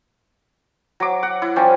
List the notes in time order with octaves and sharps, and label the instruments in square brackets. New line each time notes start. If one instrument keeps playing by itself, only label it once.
[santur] F#3 D6
F#5
E4
F3 G3 C#4 G4